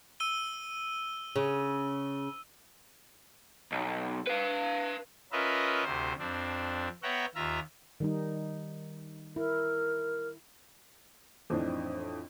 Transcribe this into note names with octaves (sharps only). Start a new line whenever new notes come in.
E6 D#7 G7
C#3
B1
B4 F5
C#4 F4 A#4 B4 D#5 E5
D2 C3 C5
F2 C4 D4
B3 C#5 E5 F#5 G5 A#5
D#2 F4 E5 A#5
D#3 G3 D#4
E4 A#4
F2 A2 E3 C4 D4 D#4